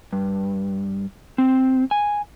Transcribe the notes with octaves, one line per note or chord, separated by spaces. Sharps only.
G2
C4
G#5